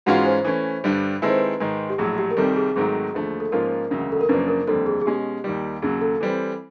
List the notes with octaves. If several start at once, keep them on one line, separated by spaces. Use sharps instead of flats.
G#2 E3 G#3 C#4 F4 F#4 F#5
C5
E3 A3 C#4
G2 D3 G3
D#3 G#3 C4 E4 A4 B4
C5
B4
G#2 D#3 G#3
G4
A#1 A2 F#3 G#4
G4
A#4
C2 C3 D#3 G3 A4
G#4
G#1 G#2 D#3 F#3 A3 G#4
D#2 D3 F3 A3
A4
G#2 F3 A#3 C#4 F4 A#4
E1 D2 C#3 F#3
A4
A#4
F#2 C#3 F3 A#3 D4 B4
A#4
F1 D#2 D3 G3 C4 A4
G#4
G#4
B2 G#3 C#4 G4
D#2 D#3 G3
D#2 C#3 F#3 G#4
A4
E3 G3 C4